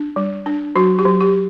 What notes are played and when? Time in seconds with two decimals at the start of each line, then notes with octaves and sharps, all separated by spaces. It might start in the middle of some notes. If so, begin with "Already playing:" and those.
Already playing: D4
0.16 G3
0.46 D4
0.76 F#3 F#4
0.99 G4
1.05 F#3
1.20 G4